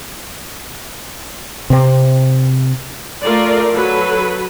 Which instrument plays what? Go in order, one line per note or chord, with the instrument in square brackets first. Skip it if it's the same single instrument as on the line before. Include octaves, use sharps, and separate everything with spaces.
[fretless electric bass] C3 C4
[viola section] A3 F4 A#4 D5
F#3 A4 B4